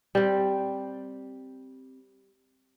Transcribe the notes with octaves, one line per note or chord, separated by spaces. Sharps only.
G3 C4